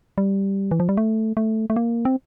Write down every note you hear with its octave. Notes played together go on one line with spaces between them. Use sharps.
G3
E3
F3
G3
A3
A3
A3
A#3
C4